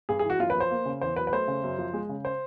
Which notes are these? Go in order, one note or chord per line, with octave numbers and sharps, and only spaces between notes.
G2 G#4
G#4
E3
F#4
F#2 F4
B4
F3
C5
A#3
C#3
E2 C5
F#3 B4
B4
A3 C5
C#3
F#2
F3
G#3
C#3
C5